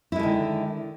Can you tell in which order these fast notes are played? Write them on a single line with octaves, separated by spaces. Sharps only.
E4 G#3 D3 D#3